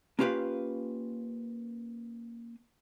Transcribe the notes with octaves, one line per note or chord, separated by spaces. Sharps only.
A#3 C#4 F4 G4 B4 F5